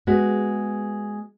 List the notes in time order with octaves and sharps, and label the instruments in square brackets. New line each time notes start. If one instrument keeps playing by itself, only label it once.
[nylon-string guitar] G#3 B3 F#4 B4